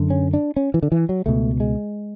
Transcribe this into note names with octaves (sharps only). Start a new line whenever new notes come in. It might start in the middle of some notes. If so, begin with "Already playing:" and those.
Already playing: F#2 D3
C#4
D4
C#4
E3
D3
E3
F#3
C#2 B2 A3
G#3